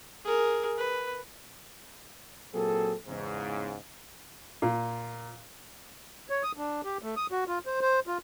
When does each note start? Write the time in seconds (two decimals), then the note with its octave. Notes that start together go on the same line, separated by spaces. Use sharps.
0.25 G#4 A#4
0.78 B4
2.54 A#2 F#3 A#3 C4 G#4 A4
3.08 E2 G#2 C#3
4.62 A#2
6.30 C#5
6.43 D#6
6.57 D4
6.84 G4
7.02 A3
7.17 D#6
7.32 F#4
7.47 F4
7.66 C5
7.81 C5
8.07 F4